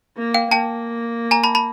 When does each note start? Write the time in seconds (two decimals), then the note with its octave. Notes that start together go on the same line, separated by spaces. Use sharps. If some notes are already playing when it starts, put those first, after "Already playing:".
0.18 A#3
0.34 F5 G5
0.51 A#3 G5 A5
1.31 G#5 A#5
1.44 A5 B5
1.55 A5 B5